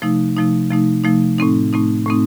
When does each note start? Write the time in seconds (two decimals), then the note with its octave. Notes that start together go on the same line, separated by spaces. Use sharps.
0.02 C3 F3 A3 D#4
0.36 C3 F3 A3 D#4
0.70 C3 F3 A3 D#4
1.04 C3 F3 A3 D#4
1.38 A2 A3 C4 D#4
1.73 A2 A3 C4 D#4
2.06 A2 A3 C4 D#4